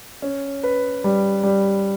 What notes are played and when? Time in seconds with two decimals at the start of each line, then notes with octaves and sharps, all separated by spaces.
0.22 C#4
0.64 B4
1.04 G3
1.43 G3